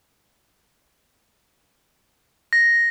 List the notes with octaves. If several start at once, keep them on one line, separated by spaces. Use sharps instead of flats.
A#6